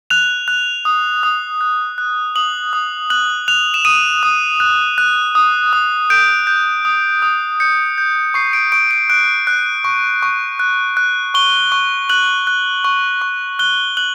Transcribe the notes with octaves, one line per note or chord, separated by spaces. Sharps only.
F#6 F7
F#6
D#6
D#6
F#6
F#6
D#6 F#7
D#6
F#6 F#7
F#6 F7
E7
D#6 D#7
D#6
F#6
F#6
D#6
D#6
G6 D7
G6
D#6
D#6
G6 C#7
G6
C#6 C7
D7
C#6 D7
D7
F#6 D7
F#6
C#6
C#6
F#6
F#6
C#6 G7
C#6
F#6 F#7
F#6
C#6
C#6
F#6 G7
F#6 F#7